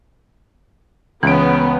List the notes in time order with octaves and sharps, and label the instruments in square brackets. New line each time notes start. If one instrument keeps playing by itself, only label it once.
[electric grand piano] C#2 D7 [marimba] E3 [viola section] B3 [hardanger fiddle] C#4